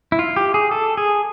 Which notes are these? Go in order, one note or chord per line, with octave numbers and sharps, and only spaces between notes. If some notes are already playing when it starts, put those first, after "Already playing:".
E4
F4
G4
G#4
A4
G#4